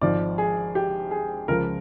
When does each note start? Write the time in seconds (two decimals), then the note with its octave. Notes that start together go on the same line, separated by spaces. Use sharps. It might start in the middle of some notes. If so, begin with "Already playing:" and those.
0.01 G#1 G#2 F3 D5
0.38 G#4
0.75 G4
1.11 G#4
1.48 C#2 C#3 F3 A#4